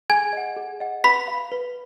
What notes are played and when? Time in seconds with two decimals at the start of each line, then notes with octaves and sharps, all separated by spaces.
0.10 G#4 G#5 G#6
0.33 D#5 F#5
0.56 G#4
0.80 D#5 F#5
1.04 B4 B5 B6
1.28 F5
1.52 B4